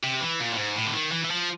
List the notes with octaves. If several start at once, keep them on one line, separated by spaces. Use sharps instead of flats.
C3
E3
A#2
A2
G#2
A2
D3
D#3
E3
E3
F3